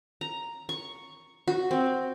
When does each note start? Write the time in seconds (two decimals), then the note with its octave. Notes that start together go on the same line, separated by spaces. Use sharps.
0.21 A#5
0.69 C#6
1.48 F#4
1.71 C4